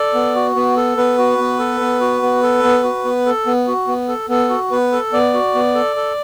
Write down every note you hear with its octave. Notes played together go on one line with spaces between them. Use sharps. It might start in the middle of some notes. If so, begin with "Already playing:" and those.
Already playing: A4 D5
B3
F#4
B3
A4
B3 B4
F#4
B3
A4
B3
F#4
B3
A4
B3
F#4
B3
A4
B3
F#4
B3
A4
B3 A4
F#4
B3 B4
A4
B3 D5
F#4
B3
A4
A4